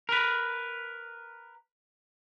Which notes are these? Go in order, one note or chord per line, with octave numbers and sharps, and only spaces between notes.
A#4 B4